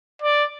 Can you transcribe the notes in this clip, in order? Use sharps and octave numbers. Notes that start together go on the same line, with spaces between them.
D5